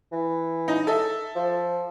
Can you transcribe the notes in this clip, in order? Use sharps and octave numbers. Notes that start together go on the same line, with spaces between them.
E3
D#4
A4 E5
F3